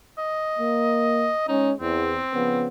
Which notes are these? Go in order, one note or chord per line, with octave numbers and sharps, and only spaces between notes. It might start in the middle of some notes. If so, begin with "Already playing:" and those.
D#5
A#3
G#3 C#4 D#4
E2 C4
C#3 F3 B3